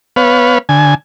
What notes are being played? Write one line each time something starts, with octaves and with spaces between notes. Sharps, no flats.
B3 B4 C#5 F5
D3 G#5